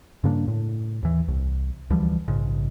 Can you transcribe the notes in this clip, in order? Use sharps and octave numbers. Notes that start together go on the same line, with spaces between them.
G2 C#3 A#3 D4
A2
D#2 E3
C2
D2 E3 F3 G3
A#1 G#2 C#3